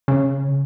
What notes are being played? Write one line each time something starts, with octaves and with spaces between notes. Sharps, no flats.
C#3